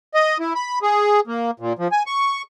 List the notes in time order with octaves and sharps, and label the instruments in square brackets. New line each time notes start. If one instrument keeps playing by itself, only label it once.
[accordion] D#5
E4
B5
G#4
A#3
A#2
F3
G#5
C#6